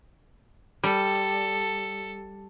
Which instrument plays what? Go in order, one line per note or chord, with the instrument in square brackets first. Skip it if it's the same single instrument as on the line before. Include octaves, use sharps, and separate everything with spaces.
[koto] G3 [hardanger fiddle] A4